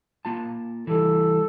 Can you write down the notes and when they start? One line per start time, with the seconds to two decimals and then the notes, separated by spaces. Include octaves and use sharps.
0.25 A#3 F4 A5
0.87 E3 G3 A4